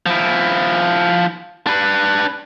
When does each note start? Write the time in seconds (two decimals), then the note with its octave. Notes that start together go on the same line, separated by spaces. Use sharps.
0.06 F3 E4
1.67 D4 B4